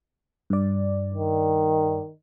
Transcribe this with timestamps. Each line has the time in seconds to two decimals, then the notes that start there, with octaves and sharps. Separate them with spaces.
0.50 G2 D5
1.14 D#3